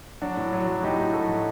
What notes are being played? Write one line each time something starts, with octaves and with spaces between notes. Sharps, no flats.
F#3 D4 F#4
A2
F#3
F#3
A2 D#4 G4
A2
F#3 F#4 A4
F#3